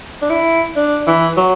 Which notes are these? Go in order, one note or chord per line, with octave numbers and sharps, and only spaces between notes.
D4
E4
D4
E3
F#3